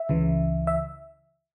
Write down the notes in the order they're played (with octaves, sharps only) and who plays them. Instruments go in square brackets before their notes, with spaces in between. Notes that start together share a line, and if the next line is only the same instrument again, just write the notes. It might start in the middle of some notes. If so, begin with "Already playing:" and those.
Already playing: [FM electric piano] E5
C#2 C#3 E3
E5